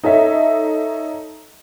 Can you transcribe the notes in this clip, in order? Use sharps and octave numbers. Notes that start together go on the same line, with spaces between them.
D#4 A4 C#5 E5